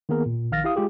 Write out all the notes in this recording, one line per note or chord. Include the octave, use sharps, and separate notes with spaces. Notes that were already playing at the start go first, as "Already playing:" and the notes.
D#3 A#3 B3 G#4 A#4
A#2
A#1 D#3 F5 F6 A6 A#6
E4 G4 F5 D#6
G#3 F4 G4 G#4